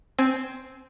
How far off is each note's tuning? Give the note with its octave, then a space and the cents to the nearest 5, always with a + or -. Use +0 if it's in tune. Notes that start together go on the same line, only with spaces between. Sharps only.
C4 +0 G#5 +20